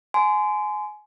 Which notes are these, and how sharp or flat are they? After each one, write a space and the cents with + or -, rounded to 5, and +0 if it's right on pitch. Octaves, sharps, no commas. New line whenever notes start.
G#5 +25 C6 -25